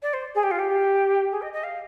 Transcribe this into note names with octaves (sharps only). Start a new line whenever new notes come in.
D5
C5
G#4
G4
F4
G4
G#4
D#5
D#5
F5